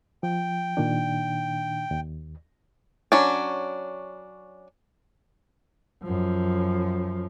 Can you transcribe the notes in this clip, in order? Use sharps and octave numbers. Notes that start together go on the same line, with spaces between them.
F3 G5
A#2 D#3 D4
D#2
F#3 C#4 D4
F#2 F3